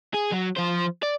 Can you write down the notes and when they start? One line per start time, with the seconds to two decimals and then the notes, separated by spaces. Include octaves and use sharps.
0.14 G#4
0.32 F#3
0.56 F3 C5
1.03 D5